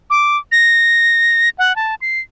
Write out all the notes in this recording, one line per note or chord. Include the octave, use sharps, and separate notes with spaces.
D6
A#6
F#5
A5
C7